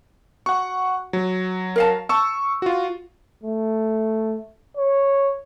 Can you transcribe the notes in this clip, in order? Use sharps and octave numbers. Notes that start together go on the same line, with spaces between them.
F#4 F#5 C#6
F#3
A#4 F5 A5
A5 C#6 E6
F4 F#4
A3
C#5